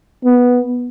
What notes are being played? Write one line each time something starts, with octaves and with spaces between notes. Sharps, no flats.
B3